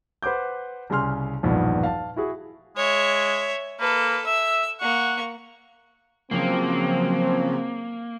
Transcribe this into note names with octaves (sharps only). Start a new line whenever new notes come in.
B4 C5 F#5 D6 G6
C2 C#3 G#5 C6 F6
A#1 E2 G2 B2 D#3 F3
F5 A5
E4 F#4 G#4
G#3 C#5 E5
A#3 A4 B4
E5 E6
A#3 F#5 C#6
C#3 F3 F#3 A#3 C4